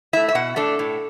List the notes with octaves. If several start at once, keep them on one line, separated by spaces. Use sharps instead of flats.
A3 E4 E5
E5
B2 F#5
A3 D4 A4
A2